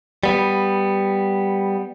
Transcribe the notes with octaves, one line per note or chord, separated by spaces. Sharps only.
G3 B3